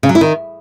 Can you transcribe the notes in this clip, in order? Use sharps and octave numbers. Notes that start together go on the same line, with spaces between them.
C#3
F#3
E4
D#3